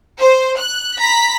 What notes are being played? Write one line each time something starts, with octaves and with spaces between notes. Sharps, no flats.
C5
F#6
A#5 B5 B6